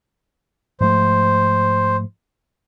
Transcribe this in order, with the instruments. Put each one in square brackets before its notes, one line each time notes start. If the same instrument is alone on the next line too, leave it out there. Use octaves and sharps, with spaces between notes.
[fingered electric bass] G#2 F3 A3 [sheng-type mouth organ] C5